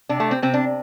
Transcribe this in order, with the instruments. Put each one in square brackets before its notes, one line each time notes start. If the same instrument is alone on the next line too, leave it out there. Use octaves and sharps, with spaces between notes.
[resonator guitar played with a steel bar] C3 D4
A3
C4
C3 C4
D4